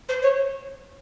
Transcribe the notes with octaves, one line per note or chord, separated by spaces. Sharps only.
C5
C#5